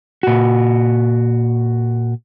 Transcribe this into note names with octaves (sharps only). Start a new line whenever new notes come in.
A#2 F#4